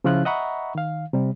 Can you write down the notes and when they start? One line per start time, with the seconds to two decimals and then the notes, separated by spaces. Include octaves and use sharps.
0.04 C#3 F3 C#4 E4 F4 F#6
0.25 D#5 E5 F#5 A#5 B5 C#6
0.75 D#3 F5
1.13 C3 G3